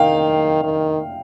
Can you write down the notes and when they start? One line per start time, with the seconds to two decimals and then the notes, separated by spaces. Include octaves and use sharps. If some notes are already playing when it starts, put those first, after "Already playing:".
Already playing: D#3 F5 G5
0.63 D#3